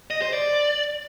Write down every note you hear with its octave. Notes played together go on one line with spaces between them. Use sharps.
D#5
C5
D5